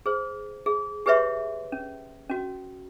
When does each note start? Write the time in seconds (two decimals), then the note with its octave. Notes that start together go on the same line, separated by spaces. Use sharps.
0.06 G#4 C5
0.66 G#4
1.06 G4 G#4 B4 C#5 E5 C6
1.72 C#4
2.30 C#4 F#4